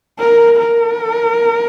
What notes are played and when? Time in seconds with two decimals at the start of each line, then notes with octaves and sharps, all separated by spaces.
0.19 A#4
0.59 A#4